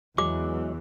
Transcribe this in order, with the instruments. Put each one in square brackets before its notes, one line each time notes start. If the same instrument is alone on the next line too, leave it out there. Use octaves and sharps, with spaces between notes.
[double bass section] E2 E3 [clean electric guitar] F#3 G#3 [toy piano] D6